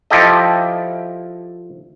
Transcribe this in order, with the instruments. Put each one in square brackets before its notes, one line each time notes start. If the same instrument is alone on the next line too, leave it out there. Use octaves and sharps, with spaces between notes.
[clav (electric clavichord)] F3 E4 G4 A4 D#5